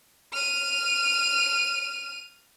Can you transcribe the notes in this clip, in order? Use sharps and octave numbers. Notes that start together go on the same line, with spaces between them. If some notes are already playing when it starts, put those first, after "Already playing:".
F6 D#7